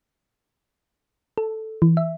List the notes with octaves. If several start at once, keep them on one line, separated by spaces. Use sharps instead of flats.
A4
E3
E5